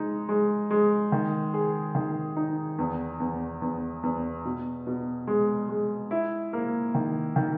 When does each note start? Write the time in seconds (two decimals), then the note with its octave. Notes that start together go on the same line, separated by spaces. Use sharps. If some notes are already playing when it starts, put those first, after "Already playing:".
Already playing: G#3 D#4
0.29 G#3
0.71 G#3
1.12 D#3
1.54 G#4
1.95 D#3
2.36 D#4
2.79 E2
3.20 E2
3.62 E2
4.03 E2
4.45 B2
4.87 B2
5.27 G#3
5.69 G#3
6.11 E4
6.53 A#3
6.95 D#3
7.36 D#3